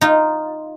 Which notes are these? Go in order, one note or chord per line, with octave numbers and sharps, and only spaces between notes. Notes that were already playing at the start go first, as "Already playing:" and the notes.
D#4 F4